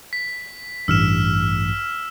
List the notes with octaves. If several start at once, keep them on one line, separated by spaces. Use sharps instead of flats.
B6
A1 G2 E6 F6 E7